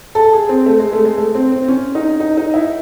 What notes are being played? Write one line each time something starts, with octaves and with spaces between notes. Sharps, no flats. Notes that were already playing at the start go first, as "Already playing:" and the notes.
A4
G#4
C4
A3
G#3
A3
G#3
A3
C4
C4
C#4
D#4
D#4
D#4
E4